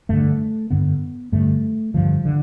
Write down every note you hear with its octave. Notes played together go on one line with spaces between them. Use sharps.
G2 D3 A3
G2 D3 B3
G2 D3 A3
G2 D3 F3
D3